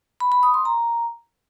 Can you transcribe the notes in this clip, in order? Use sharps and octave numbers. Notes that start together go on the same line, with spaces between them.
B5
B5
D#6
C6
A#5